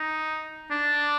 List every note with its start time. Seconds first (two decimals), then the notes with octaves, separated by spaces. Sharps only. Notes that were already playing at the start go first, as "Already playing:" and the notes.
Already playing: D#4
0.70 D4